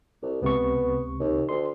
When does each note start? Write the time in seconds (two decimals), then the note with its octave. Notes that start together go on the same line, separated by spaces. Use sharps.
0.22 C2
0.42 C#2 C3 B3 C#6
1.20 D#2
1.49 D2 C6